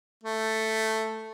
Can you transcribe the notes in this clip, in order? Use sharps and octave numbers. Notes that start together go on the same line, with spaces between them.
A3